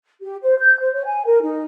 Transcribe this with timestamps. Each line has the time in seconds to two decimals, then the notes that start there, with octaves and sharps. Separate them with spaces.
0.22 G4
0.43 C5
0.59 G6
0.81 C5
0.94 C#5
1.06 G#5
1.26 A#4
1.42 D#4